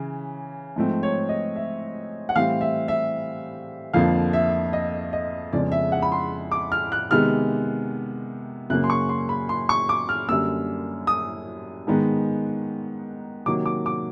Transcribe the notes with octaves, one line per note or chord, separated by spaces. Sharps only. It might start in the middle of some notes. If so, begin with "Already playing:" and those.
Already playing: C#3 E3
G#2 F3 A3 C4
C#5
D#5
E5
F#5
A2 E3 G3 C4 F5
E5
E5
F2 D3 F3 A#3 F5
E5
D#5
D#5
F2 C#3 F3 G#3 B3 D5
E5
F#5
B5
C6
D6
F6
F#6
C3 D#3 G#3 B3 F6
F#2 C#3 F#3 A#3 F#6
C6
C#6
C6
B5
C6
C#6
D6
F6
F#2 D3 G3 A#3 E6
D#6
G#2 D#3 G#3 B3
C3 D#3 F#3 A#3 D6
D6
D6